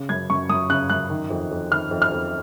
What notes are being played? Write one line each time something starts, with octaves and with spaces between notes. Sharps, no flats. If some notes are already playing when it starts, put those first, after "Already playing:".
Already playing: C#3
F#2 G#6
F#2 C#6
F#2 D#6
C#3 F#6
F#2 F#6
D#3
F2
F2
D#3 F6
F2
F6
F2